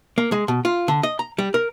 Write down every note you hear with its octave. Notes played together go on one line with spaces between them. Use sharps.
A#3
G#3
B2
F4
D3
D#5
A#5
G3
A#4